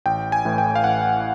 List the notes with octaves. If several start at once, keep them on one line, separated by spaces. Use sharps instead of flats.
A1 G5
G#5
A2 E3
G5
F5
A1 F#5